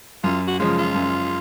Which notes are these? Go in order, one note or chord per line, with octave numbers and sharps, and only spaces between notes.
F#2 F4
F#4
C#3 F3 G#3 F4
F4
F#2